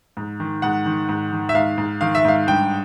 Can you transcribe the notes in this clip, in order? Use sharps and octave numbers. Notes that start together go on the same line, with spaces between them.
G#2
D#3
G#2 F#5
D#3
G#2
D#3
E5
G#2 F5
G#2
D#3 F5
E5
G#2 F5
G2 G5